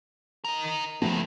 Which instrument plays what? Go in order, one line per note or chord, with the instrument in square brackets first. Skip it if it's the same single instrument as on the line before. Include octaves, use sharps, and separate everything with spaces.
[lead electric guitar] D#4 A#4
[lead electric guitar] G2 C#3 [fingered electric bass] F3 A3 B3